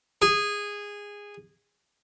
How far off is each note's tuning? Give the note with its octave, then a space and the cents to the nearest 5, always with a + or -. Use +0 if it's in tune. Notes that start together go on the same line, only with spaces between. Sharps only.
G#4 -15